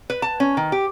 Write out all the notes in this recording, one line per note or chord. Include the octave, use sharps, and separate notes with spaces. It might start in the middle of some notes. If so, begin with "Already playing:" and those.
B4
A5
C#4
D#3
G4